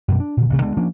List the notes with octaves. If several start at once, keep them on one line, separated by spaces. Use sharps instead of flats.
F#2 B2 G3
D4
A#2 D3
A1 D2 C3 A3
D2 D3 G#3 B3
F3 A#3 C#4 D4